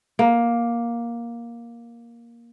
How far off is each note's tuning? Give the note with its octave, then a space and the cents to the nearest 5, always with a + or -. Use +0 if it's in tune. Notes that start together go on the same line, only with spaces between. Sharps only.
A#3 +10